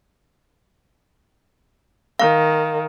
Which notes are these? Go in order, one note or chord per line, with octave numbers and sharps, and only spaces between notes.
D#3 F5